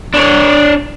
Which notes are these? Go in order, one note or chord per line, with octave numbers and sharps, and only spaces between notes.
D4 C#5